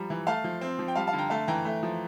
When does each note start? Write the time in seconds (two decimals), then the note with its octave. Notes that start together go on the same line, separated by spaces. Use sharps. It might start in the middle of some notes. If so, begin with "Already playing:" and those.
Already playing: F3 G3 A#5
0.10 E3
0.27 A3 F5 A5
0.44 F3
0.61 C4
0.79 F3
0.88 G5
0.95 G3 F5 A5
1.07 F5 A5
1.13 D3
1.18 G5 A#5
1.30 A3 F5 A5
1.48 E3 G5 A#5
1.65 A3
1.83 F3